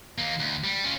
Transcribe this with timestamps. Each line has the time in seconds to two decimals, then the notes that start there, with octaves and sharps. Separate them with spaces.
0.18 D#2 A#3
0.39 D2
0.64 G3
0.84 C#4 F4